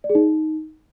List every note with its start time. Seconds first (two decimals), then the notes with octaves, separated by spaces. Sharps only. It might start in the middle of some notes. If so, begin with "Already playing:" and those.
0.04 D5
0.10 G#4
0.15 D#4